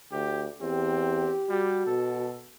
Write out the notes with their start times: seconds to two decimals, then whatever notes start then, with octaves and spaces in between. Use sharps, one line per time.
0.12 D2 G4
0.61 E2 C4 G4
1.49 G3 F#4
1.86 B2 A4